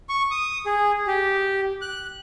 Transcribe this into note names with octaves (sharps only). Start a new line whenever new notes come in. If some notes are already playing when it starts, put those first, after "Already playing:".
C#6
D#6
G#4
G4
F#6